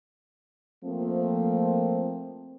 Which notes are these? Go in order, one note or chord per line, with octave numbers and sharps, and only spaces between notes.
F3 A3 A#3 C4